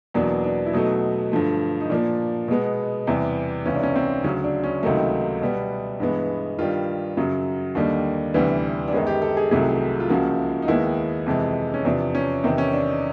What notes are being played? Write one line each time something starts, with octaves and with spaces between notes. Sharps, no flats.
E2 B2 F#3 A#3 D4
D4
E4
B2 F#3 A3 D#4
G2 D3 F3 A3
D#4
A#2 F3 A#3 D4
B2 G#3 B3
E2 C3 E3 G3
C#2 C3 E3 C#4
D4
C#4
C4
D2 C#3 F#3 C#4
D4
C#4
C#2 C3 D#3 F#3 A3 D#4
B2 G3 B3
G2 E3 G#3 B3
G2 D#3 G3 F4
F#2 C#3 F#3
D#2 D3 G3 A#3 D#4
D2 C3 E3 G3 B3
D4
F#2 D#3 G#3 B3 C#4
G4
A4
G#4
C2 C3 D#3 F#3 A3 G#4
F4
C#2 C#3 F3 A#3 F#4
D#4
D#2 D#3 G#3 B3 E4
F2 C3 E3 G#3
C#4
E2 C3 F3 D4
C#4
E2 C3 D#3 C4
C#4
D4
D#4